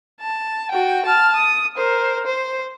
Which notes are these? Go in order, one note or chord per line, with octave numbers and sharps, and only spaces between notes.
A5
F#4 G5
A5 F6
D#6
A#4 C5
C5